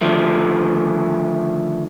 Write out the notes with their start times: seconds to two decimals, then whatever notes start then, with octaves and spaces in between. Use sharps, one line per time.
0.01 D3 D#3 F3 A3